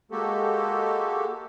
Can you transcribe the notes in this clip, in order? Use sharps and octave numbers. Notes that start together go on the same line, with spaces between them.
G#3 A#3 F#4 G4 A4